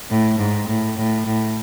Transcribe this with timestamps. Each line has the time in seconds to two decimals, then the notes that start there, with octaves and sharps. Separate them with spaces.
0.10 A2
0.39 G#2
0.68 A2
0.97 A2
1.26 A2